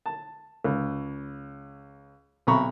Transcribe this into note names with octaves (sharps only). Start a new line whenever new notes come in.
A5
C#2
B1 C3 A#5 B5 C#6